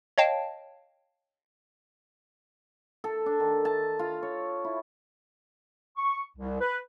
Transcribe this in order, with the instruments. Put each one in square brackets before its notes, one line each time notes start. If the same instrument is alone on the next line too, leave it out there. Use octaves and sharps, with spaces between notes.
[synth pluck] C#5 D#5 F5 G5 A5
[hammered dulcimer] A4
D4
D#3
A5
F4
C#5
E4
[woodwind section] C#6
C2
B4